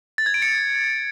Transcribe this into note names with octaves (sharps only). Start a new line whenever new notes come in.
A6
G#6
D7
C#7